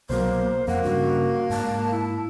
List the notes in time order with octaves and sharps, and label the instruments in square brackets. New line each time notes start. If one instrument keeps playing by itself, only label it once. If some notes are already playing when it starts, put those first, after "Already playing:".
[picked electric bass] C2 B2 F#3 [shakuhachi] A#3 [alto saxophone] C5
[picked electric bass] F2 [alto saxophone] A#3 [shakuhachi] F#5
[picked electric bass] G2 C#3 [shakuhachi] F#4
[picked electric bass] G#2 [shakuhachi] A5
[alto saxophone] E4